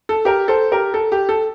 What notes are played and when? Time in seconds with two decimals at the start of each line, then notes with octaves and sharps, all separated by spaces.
0.09 A4
0.25 G4 A#4
0.48 A4 C5
0.72 G4 A#4
0.94 A4
1.12 G4
1.29 A4